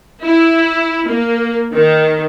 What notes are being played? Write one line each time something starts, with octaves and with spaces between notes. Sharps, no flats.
E4
A#3
D#3